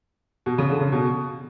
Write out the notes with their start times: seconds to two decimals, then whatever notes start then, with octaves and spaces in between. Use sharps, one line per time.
0.46 B2
0.58 C#3
0.70 D3
0.81 C#3
0.92 B2